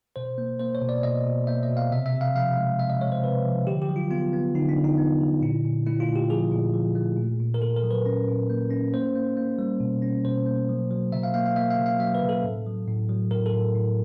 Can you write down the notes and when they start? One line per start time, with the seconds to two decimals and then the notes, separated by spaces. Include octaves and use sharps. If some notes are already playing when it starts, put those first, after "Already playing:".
0.16 B2 C5
0.38 A#3
0.60 A#3 C5
0.75 C#5
0.82 B2
0.89 D5
1.03 B2 D#5
1.26 B2
1.47 A#3 E5
1.63 D#5
1.69 B2
1.77 F5
1.91 C3 E5
2.06 E5
2.13 C3
2.21 F5
2.35 F3 F5
2.57 G#3
2.79 C3 E5
2.90 D#5
3.01 G#3 C#5
3.12 C5
3.23 C3 B4
3.45 F3
3.67 D3 G4
3.82 G4
3.89 F#3
3.96 F4
4.10 B3 F4
4.33 B3
4.55 D3 D#4
4.69 D4
4.77 D3
4.84 D#4
4.98 B3
5.21 D3
5.42 A#2 E4
5.65 A#2
5.86 A3 E4
6.00 F4
6.09 A#2
6.16 G4
6.30 F3 G#4
6.52 A#2
6.74 F3
6.95 A3
7.17 A#2
7.40 A#2
7.54 A#4
7.61 A#2 A4
7.76 A#4
7.83 F#3
7.91 B4
8.06 C#4
8.28 A#2
8.50 A#3
8.71 C#4
8.93 A#3 C5
9.15 A#3
9.37 A#3
9.59 G3
9.80 B2
10.02 C#4
10.25 B2 C5
10.46 A#3
10.69 F#3
10.91 F#3
11.12 C#3 E5
11.23 F5
11.34 A#3 F5
11.46 F5
11.56 A#3 E5
11.70 F5
11.78 C#3
11.86 F5
11.99 F#3 E5
12.15 B4
12.21 C#3
12.29 A4
12.44 A2
12.66 F#3
12.88 A2
13.09 F#3
13.31 A2 A#4
13.46 A4
13.53 A2
13.75 A2